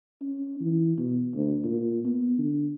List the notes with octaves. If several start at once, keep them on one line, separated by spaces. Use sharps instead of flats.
C#4
E3
B2
D2
A#2
B3
D3